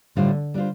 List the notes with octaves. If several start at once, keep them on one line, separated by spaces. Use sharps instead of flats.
A2 D3 G3 D4 F4 C5
G3 D4 F4 C5